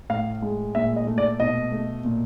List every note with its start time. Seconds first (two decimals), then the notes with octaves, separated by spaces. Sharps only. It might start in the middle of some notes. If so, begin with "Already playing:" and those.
0.10 A2 F5
0.42 G#3
0.75 A#2 E5
0.96 D#5
1.07 A3
1.18 D5
1.40 B2 D#5
1.72 A3
2.05 A#2